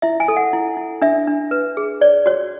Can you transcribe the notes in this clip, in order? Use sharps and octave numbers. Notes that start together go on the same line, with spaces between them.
E4 E5
G#5
A4
F#5
E4
E4
D4 E5
D4
B4
G#4
C#5 D5
F#4 C#5